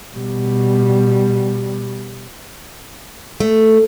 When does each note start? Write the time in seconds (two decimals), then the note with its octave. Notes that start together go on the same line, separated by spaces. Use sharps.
0.16 B2 G3
3.40 A3